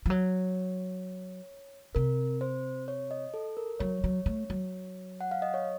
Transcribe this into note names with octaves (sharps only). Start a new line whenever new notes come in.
F3
F#3 C#5
C3 A#4
C5
C#5
D#5
A4
A#4
F#3 C#5
F#3
A3
F#3
F#5
F5
D#5
C#5